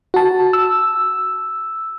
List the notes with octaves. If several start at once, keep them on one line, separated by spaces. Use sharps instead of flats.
F#4 A5
E6